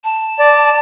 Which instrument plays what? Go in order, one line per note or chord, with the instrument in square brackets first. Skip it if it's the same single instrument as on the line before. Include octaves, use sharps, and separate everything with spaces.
[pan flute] A5
[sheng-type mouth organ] D5